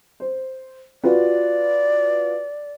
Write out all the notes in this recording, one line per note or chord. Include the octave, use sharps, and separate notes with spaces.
C5
F4 F#4 B4 D5